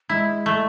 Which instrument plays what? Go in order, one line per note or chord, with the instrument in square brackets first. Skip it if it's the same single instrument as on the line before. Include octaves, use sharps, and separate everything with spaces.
[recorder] G#3 [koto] E4
[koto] A3